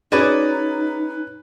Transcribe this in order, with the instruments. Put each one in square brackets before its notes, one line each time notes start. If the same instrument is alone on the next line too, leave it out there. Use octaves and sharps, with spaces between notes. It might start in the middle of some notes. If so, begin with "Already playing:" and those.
[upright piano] C#4 B4 [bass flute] D#4 [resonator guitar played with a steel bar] F#4 G#4 D5